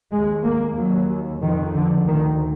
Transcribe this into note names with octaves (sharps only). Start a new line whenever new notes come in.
D#2 G#3
A#3
D#2 F#3
F2 D#3
D3
D2 D#3